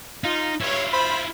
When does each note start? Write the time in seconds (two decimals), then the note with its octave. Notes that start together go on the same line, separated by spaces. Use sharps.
0.24 D#4 F4
0.61 G2 E4 F4 C#5
0.92 C5 B5